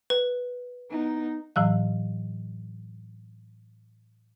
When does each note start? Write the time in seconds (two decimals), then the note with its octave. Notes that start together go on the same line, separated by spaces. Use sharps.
0.10 B4
0.91 B3 D#4
1.56 A2 E3 F#3 F5